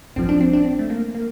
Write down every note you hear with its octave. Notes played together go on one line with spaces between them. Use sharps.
A1 G2 F3 C4
D4
C4
D4
C4
A3
A#3
A#3